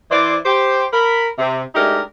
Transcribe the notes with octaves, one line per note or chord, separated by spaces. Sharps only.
E3 C5 D5
G4 C5
A#4 B5
C3
G#3 A3 D4 D#4 G4 A#4